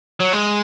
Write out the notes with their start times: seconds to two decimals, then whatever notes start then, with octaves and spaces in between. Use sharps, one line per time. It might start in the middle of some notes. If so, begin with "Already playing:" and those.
0.20 F#3
0.33 G#3